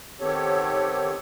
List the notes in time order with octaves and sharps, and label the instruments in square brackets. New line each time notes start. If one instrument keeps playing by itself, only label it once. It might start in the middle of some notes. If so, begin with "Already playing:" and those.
[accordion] D#3 B3 C4 G4 A4 C#5